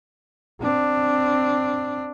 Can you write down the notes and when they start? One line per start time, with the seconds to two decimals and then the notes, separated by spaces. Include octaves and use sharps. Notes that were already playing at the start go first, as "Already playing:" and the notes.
0.61 C4 D4